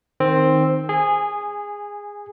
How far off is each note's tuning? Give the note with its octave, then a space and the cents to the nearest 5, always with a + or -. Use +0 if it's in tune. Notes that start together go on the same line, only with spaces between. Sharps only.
D#3 +0 C4 +5
G#4 -15 G#5 +0